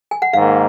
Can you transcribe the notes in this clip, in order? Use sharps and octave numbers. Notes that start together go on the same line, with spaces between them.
G#5
F#5
G#2 D#3 A#3 F5